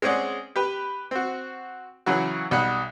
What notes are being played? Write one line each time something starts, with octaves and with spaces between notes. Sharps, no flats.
G#3 C4 C#4 G#4 D5 F#5
G4 B4
C4 F#4
C#3 E3 F#3 F#4
B1 G3 F#5 F#6